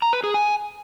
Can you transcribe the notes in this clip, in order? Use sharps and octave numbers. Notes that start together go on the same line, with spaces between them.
A#5
B4
G#4
G#5